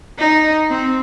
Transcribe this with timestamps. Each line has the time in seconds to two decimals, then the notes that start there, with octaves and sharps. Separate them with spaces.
0.19 D#4
0.70 C4